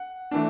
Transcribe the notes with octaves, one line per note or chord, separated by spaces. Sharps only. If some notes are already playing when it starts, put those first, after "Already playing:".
Already playing: F#5
E3 A3 D4